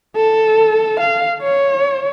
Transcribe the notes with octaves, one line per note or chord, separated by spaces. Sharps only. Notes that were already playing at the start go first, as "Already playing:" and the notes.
A4
F5
C#5